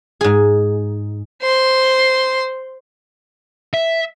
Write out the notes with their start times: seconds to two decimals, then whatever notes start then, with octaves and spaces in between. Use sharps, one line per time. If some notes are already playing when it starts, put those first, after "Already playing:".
0.21 G#2 G#4
1.42 C5 C6
3.73 E5